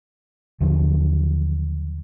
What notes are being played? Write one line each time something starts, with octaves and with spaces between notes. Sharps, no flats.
D#2 D3 F3 F#3